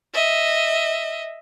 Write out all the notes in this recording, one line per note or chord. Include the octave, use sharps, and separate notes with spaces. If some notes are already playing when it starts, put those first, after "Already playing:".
D#5 E5